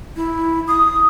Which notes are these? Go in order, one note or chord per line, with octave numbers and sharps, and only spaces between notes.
E4
D#6